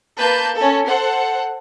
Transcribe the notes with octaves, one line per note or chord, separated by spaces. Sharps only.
A#3 B4 A5 G6
C#4 A4
A4 C5 F#5